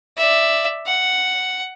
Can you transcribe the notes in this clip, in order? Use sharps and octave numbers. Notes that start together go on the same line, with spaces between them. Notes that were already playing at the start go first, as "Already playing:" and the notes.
D5 E5
F#5